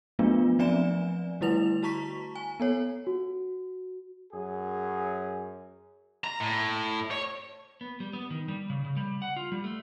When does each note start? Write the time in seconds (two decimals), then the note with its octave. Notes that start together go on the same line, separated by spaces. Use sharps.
0.19 F3 F#3 A3 B3 D4 F4
0.59 F3 C4 D5 E5 G#5 E7
1.41 D3 G3 A3 E4 B4 F7
1.82 F#4 A5 A#5 C#6 B6
2.36 G#5
2.60 B3 A4 C#5
3.07 F#4
4.33 F#2 G#4
6.24 A#5
6.40 A2
7.11 C#5
7.81 B3
8.00 G3
8.13 B3
8.30 D#3
8.48 G3
8.70 C#3
8.85 C#3
8.96 G3
9.22 F#5
9.36 F4
9.52 G3
9.64 A3